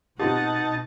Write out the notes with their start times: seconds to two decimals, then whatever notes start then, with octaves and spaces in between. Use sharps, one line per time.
0.20 B2 C4 D#4 F4 G4 F#5 A5